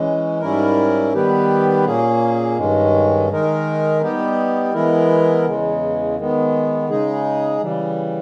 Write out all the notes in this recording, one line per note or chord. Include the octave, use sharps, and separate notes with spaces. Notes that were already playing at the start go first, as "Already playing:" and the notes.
Already playing: E3 G#3 C#4
G#2 G3 C#4 E4 A#4
D#3 G3 B3 G4 B4
A#2 A#3 C#4 G#4
G2 D#3 G#3 C#4
D#3 G#3 D#4 A#4
G3 B3 D#4 G4
E3 G#3 B3 E4 A#4
E2 C#3 G#3
D#3 G#3 B3
C#3 G#3 D#4 G#4
C#3 E3 G3